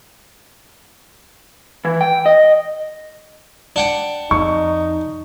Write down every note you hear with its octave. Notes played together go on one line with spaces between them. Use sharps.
E3
G5
D#5
D4 F#5 G5
F2 D#4 C#6